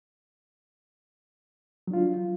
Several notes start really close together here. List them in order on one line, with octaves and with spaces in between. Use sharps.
F#3 D4 F4